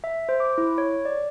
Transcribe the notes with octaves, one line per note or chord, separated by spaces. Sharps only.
E5
C5
D6
E4
C#5
D5